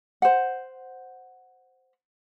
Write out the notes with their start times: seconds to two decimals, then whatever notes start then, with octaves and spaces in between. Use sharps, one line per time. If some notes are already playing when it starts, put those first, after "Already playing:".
0.22 C5 F#5